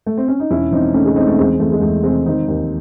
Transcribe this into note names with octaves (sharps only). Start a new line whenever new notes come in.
A3
C4
C#4
D#4
E1 C#4 E4
E1 C4 D#4
C#3 A3 C#4
G#3
C#3 C4 D#4
A3 C#4
E2 G#3 C4
E2 A3
G#3
E2 A3
C3 G#3 C4
D#3 C4 D#4
D#2